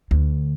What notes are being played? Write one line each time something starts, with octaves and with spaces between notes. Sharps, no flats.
D2